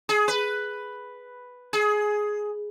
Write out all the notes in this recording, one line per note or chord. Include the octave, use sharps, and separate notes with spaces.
G#4
B4
G#4